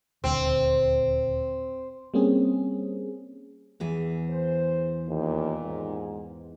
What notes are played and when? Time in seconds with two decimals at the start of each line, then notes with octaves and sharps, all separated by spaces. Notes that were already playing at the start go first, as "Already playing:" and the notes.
0.24 D#1 D2 C4
2.14 G3 A#3 C4 C#4 G#4
3.80 E2 E3 G#4
4.30 C5
5.09 D#2 A#2
5.64 G#2